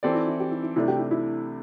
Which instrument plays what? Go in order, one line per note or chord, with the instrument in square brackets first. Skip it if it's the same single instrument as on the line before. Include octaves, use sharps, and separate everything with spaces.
[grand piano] E3 C4 A4 D5 [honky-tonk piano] G4
[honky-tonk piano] E4
E4
G4
E4
E4
[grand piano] C2 C3 A3 D4 [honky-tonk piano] E4
[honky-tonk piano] G4
E4
E4